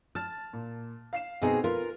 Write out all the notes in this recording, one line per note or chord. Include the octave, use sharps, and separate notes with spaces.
A5 F6 A6
A#2
F5 C7 E7
B2 B3 C4 D#4 G#4 A#5
F4 A#4 B4